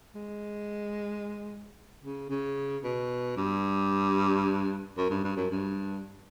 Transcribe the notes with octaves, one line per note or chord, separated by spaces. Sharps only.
G#3
C#3
C#3
B2
G2
F#2
G2
G2
F#2
G2